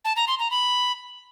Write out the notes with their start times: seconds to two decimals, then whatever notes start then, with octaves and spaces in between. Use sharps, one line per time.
0.05 A5
0.16 A#5
0.28 C6
0.39 A#5
0.51 B5